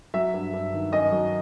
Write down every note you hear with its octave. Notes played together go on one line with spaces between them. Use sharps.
F#3 E5
G2
G2
D#3
F#2 D#5
F#3